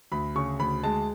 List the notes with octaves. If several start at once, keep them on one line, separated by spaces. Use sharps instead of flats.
D2 B5
C#3 C#6
D2 B5
G#3 A5